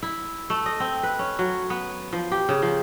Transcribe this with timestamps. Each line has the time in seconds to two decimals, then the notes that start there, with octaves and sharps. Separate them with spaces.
0.03 E4
0.50 A3
0.66 D#5
0.80 C4
1.03 B4
1.19 C#4
1.39 F#3
1.70 B3
2.13 F3
2.32 G4
2.49 C#3
2.62 F3